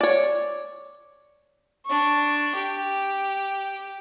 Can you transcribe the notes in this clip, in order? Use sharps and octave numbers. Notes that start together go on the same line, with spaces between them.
C#5 D5
D4 C#6
G4